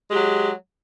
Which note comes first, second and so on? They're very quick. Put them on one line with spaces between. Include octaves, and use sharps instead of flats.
G#3 G4 F#3